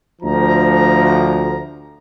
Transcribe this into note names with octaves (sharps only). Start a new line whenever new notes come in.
D2 F3 A#5